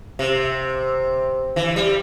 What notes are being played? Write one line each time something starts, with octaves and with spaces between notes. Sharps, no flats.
C3
E3
G3